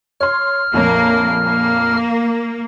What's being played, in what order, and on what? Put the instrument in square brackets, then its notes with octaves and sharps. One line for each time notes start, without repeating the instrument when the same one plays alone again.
[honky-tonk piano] C#5 C6 [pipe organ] F6
[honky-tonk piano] A#1 F2 C#5 [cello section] A#3
[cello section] A#3